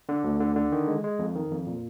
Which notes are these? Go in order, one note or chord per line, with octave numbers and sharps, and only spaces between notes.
D3
D2
D3
D3
D#3
G#3
G#3
F2
D#3
F2
A#2